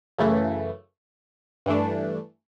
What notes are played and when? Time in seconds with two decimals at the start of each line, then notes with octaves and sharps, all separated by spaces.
0.19 F#2 C#3 E3 A3
1.66 G2 E3 A3 D4